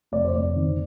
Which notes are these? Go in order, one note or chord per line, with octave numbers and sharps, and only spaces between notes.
F1 D5
C5
F1 D5
D#3